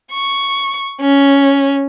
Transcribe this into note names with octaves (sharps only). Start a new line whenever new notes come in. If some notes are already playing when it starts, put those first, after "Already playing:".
C#6
C#4